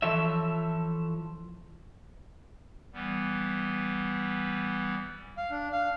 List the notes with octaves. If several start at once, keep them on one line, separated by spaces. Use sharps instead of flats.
E3 F3 A4 C#5 E5
E3 G3 B3
F5
D4
F5